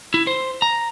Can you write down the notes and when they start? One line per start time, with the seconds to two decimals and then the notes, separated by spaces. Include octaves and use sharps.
0.14 E4
0.27 C5
0.62 A#5